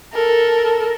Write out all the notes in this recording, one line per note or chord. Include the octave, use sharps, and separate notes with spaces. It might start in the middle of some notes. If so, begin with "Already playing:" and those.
A4 A#4